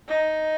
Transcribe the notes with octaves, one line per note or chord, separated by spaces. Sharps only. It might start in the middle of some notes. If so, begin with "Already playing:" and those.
D#4